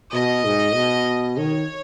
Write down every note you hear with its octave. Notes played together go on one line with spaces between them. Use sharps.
B2 D#5
G#2
B2
D#3 C#5